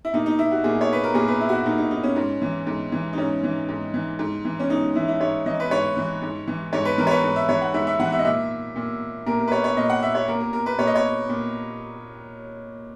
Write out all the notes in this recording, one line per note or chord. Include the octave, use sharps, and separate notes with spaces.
E4
A#2 D#4
D#4
E4
F#4
A#2 G#4
C#5
B4
A#4
A#2 G#4
B4
E4
F#4
E4
A#2 D#4
D#4
D#4
C#4
G#2
E3
G#2
E3
D#4
G#2 C#4
E3
G#2
E3
G#2
E3
C#4
G#2 D#4
E3 E4
E4
G#2 C#5
E3 D#5
B4
G#2 C#5
E3
G#2
E3
G#2 C#5
B4
E3 A#4
C#5
B4
G#2
E5
E3 C#5
F#5
G#2 E5
E5
E3 F#5
E5
D#5
A#2 E5
A#2
A#2 A#4
A#4
B4
C#5
C#5
A#2 D#5
F#5
E5
C#5
A#2 A#4
A#4
A#4
B4
A#2 C#5
D#5
C#5
A#2